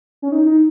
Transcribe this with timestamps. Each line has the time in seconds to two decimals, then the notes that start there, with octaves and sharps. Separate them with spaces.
0.22 C#4
0.32 D#4
0.46 D#4